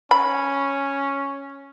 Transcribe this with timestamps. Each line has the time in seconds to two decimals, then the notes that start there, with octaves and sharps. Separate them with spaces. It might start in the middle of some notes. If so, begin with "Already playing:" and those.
0.11 C#4 B5